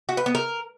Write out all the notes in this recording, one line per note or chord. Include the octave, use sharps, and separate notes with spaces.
F#4
B4
B3
A#4